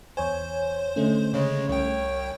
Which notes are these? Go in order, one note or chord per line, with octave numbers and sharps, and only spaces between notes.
E2 C5 C#5 G#5
D3 G#3 A3 C#4
C#3 G#3 C#5
C2 C#5 G5